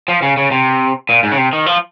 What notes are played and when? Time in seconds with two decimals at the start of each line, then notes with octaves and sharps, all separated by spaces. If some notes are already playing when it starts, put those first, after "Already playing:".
0.08 F3
0.22 C#3
0.37 C#3
0.51 C3
1.09 A#2
1.23 G#2
1.32 C#3
1.38 C3
1.53 D#3
1.66 F3